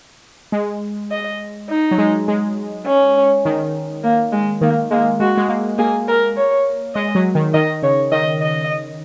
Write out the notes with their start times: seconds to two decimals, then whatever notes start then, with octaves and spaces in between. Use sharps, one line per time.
0.52 G#3
1.11 D#5
1.70 D#4
1.91 F#3
1.98 G#3
2.28 G#3
2.86 C#4
3.45 D#3
4.03 A#3
4.32 G#3
4.61 D#3 A#3
4.91 G#3 A#3
5.20 G#3 F#4
5.37 G#3
5.49 A#3
5.78 A#3 G#4
6.08 A#4
6.37 C#5
6.95 G#3 D#5
7.15 F#3
7.35 D#3
7.54 D#3 D#5
7.83 C#3 C#5
8.12 D#3 D#5
8.42 D#5